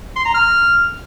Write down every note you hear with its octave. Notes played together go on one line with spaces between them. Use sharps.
C6
A#5
F6